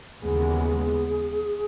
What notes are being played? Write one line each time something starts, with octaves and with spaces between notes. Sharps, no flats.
D#2 C#3 E3 G#3 B3 G#4